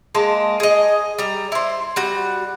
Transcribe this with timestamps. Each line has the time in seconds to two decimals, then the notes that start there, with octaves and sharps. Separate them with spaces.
0.15 G#3 A#3 A5
0.60 G#4 D#5
1.18 G3 A#5
1.52 E4 C5
1.96 G3 F#4